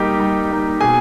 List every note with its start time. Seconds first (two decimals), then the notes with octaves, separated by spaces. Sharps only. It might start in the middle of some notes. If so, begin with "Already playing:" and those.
Already playing: G3 A#3 D#4 G4 G5
0.20 G3
0.51 A#3 D#4
0.81 B2 G#4 G#5